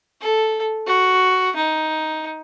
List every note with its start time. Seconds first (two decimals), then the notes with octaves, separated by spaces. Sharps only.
0.21 A4
0.87 F#4
1.56 D#4